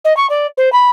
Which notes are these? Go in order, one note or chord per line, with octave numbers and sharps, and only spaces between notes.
D#5
C#6
D5
C5
B5